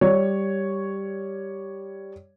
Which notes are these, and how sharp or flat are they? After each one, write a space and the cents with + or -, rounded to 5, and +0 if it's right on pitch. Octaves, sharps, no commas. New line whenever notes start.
G3 +0 C#5 +0